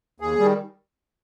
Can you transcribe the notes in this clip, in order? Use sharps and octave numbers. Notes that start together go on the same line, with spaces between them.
D#2 G#4
D#3 G3